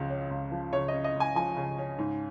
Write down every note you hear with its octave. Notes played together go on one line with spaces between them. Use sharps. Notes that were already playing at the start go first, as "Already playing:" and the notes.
Already playing: C#2 C#3 F3
C#4
C#2
F3
C#3 C#5
D#5
C#4
D#5
C#2
G#5
F3 G#5
C#3
C#4
G#2